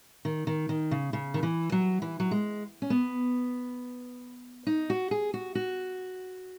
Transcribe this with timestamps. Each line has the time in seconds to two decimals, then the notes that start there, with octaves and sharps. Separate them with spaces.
0.25 D#3
0.47 D#3
0.69 D#3
0.91 C#3
1.13 C#3
1.34 D#3
1.43 E3
1.72 F#3
2.02 E3
2.20 F#3
2.31 G#3
2.82 C#4
2.90 B3
4.67 D#4
4.90 F#4
5.11 G#4
5.34 F#4
5.55 F#4